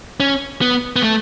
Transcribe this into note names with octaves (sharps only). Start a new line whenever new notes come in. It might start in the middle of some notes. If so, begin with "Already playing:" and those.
C#4
B3
B3
A3